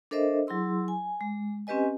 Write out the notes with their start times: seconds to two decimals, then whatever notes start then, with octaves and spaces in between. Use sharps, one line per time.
0.11 D4 A4 A#4 C5 D#5 E5
0.47 F#3 E4 G#4 C6 E6
0.88 G#5
1.21 G#3
1.67 C4 C#4 G4 B4 D#5 G#5